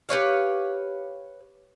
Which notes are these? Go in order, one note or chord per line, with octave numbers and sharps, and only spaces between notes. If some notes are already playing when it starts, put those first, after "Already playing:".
G4 B4 C#5 F5